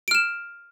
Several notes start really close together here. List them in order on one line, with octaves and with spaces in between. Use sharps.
D7 F6 E7